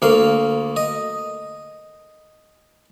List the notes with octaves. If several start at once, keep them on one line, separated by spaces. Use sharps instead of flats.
D2 A#3 F5
D#5